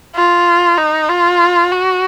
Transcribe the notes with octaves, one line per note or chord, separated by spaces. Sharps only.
F4
D#4
F4
F#4